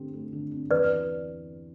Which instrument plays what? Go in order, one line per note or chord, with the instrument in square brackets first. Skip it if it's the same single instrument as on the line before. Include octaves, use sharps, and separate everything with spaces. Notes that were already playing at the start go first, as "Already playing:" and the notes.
Already playing: [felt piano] D3 A3 C4 G4
A3
D3
C4
[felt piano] E2 [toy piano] B4 D5